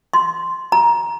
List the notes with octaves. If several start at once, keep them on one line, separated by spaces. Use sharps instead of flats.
C6
A#5